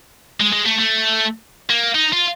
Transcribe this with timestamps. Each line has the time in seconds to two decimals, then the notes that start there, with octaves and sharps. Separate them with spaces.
0.40 G#3
0.53 G#3
0.66 A3
0.79 A3
1.70 A#3
1.95 D#4
2.13 F4